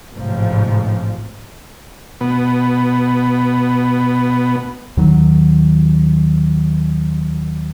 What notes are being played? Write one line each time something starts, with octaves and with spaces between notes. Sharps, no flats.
A1 G#2 C3 F3
B2 B3
D#2 D#3 F#3